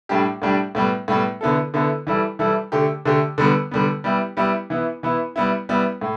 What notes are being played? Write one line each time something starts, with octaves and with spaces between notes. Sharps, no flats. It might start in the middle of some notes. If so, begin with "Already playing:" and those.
A2 G3 D4 G4
A2 G3 D4 G4
A2 G3 B3
A2 G3 B3
D3 B3 E4 A4
D3 B3 E4 A4
E3 G3 E4 A4
E3 G3 E4 A4
D3 A3 G4
D3 A3 G4
D3 G3 B3
D3 G3 B3
G3 B3 E4 G4
G3 B3 E4 G4
E3 B3 E4
E3 B3 E4
G3 B3 E4
G3 B3 E4
A2